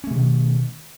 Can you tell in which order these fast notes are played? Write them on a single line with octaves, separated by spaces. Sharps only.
C#4 A3 B2 D#3